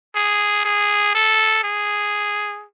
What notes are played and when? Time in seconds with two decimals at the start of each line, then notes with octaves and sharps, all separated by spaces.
0.15 G#4
0.65 G#4
1.15 A4
1.63 G#4